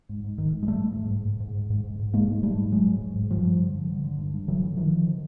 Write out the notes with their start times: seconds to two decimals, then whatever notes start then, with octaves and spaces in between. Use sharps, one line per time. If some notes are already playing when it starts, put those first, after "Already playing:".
0.09 G#2
0.24 G#2
0.38 G#2 D#3
0.52 G#2
0.63 G#3
0.67 G#2 G3 A3
0.82 G#2
0.96 G#2
1.11 G#2
1.25 G#2
1.40 G#2
1.55 G#2
1.70 G#2
1.84 G#2
1.99 G#2
2.13 G#2 G#3 A#3
2.28 G#2
2.43 G#2 G3 A3
2.58 G#2
2.72 G#2 F#3 G#3
2.86 G#2
3.02 G#2
3.16 G#2
3.31 G2 F3 G3
3.45 G2
3.60 D3
3.75 G2
3.90 D3
4.04 D3
4.18 G2
4.34 G2
4.48 D3 E3 F#3
4.62 D3
4.77 D3 D#3 F3
4.92 D3
5.06 D3